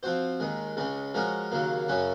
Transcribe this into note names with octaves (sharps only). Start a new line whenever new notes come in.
F3 C4 F#4 C5
D#2 D#3 G#3
C#2 C#3 G#3 C#4
F3 G#3 C#4 F#4 A#4
D#2 C#3 F#3 A#3
F#2 C#3 F#3 C#4 F#4